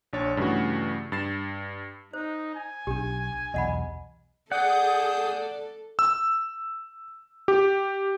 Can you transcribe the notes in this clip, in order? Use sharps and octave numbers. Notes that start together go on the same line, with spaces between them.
A#1 D4 C#5 A6
G2 C#3 E3 A3 F#4
G2 A6 C7 E7
D#4 C5
G#5
B1 D4 G4
B1 E2 D#5 F#5 B5
G#4 A4 D5 F#5 D#6 G6
E6
G4